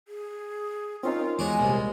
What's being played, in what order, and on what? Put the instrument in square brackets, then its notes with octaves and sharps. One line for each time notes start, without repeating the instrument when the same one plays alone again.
[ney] G#4
[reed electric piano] C4 C#4 D#4 [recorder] F4 [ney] A#4
[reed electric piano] E2 [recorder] G#3 [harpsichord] F#4 C#5 D6 [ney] G#5
[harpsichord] C2 A#2